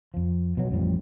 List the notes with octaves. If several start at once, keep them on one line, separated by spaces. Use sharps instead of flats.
F2 F3
B2 F#3
A1 F2 F3 G3